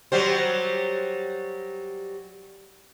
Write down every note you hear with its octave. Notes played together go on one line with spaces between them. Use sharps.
F#3 G3 C5